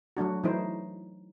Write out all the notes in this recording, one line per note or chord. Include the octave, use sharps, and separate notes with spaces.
F#3 A3 D4 F#4
E3 F#3 A3 D#4 E4 C5